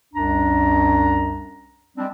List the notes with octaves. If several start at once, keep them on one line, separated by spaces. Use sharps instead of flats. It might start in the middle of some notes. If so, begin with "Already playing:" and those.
C2 F#2 D4 A#5
G3 G#3 C4 D4